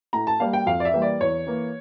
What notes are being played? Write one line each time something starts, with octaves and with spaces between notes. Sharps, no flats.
A2 A#5
A5
G3 A#3 F5
G5
F2 F5
D5
E5
E3 G3 A#3
D5
E2 C#5
E3 A#3